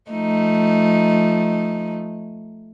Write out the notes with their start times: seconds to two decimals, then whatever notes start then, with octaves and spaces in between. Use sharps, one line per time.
0.10 F3 A3 D#4